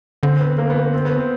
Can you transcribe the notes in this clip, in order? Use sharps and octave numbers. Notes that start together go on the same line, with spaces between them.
D3 C4
B3
A#3
B3
B3
C4
B3
C4